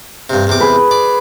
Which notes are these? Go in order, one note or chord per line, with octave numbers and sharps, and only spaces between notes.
G2 C3
E2 C3 D6
G#4 B4
D5